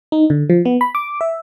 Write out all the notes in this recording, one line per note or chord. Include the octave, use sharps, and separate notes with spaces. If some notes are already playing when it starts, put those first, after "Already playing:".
D#4
D3
F3
B3
B5
D6
E5